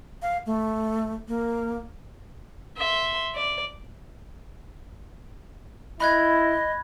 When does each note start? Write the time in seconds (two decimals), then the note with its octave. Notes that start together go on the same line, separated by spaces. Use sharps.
0.22 F5
0.46 A3
1.28 A#3
2.78 E5 C6
3.35 D5
6.00 E4 D#5 B5 F#6 G#6